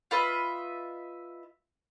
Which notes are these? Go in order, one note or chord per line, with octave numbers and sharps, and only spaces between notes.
F4 B4 D#5 E5